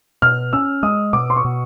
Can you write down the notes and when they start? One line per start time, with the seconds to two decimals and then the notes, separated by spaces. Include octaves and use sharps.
0.22 B2 F6
0.53 C#4 E6
0.83 G#3 D#6
1.13 B2 D6
1.30 C6
1.37 C#6
1.45 B2